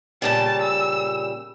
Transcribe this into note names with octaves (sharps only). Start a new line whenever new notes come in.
A#2 C#3 G3 A5
E6